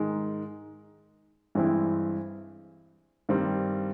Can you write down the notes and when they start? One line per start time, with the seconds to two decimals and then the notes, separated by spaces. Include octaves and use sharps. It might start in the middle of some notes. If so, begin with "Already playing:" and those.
Already playing: G#2 D#3 G#3
1.55 G2 E3 G#3 C4 E4
3.29 G2 D#3 G3 C4